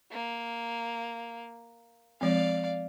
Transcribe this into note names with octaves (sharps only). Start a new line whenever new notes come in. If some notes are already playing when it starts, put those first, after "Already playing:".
A#3
F3 G#3 C4 D5 F5